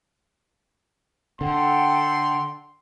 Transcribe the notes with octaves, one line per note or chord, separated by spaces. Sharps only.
D3 A4 F#5 G5 C6